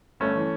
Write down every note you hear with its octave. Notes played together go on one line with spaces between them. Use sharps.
G1 A3 C#4
E3